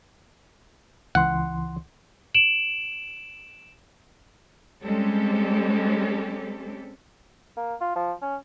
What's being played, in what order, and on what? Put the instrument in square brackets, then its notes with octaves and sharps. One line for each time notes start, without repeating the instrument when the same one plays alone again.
[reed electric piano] C#2 E3 C6 [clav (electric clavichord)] F#5
[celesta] D7 E7 F#7
[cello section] G3 G#3 C4 C#4 G4 A4
[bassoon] A#3
F4
F3
C#4